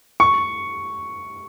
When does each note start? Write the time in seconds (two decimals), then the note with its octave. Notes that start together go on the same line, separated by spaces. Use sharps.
0.20 C#6